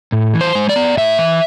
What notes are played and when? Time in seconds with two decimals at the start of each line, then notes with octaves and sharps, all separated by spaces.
0.12 A2
0.34 E3
0.41 C5
0.55 G#3
0.69 D5
0.76 B3
0.97 A2 E5
1.19 E3